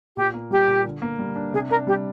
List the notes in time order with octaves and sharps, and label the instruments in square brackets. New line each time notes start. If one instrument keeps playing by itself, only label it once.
[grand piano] A#2 [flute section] G4
[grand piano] A#3
[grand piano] G3 [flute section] G4
[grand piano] A#2
D3
A#3
G3
D4
[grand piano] C3 [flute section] G#4
[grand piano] D4 [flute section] A#4
[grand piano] G3 [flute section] G4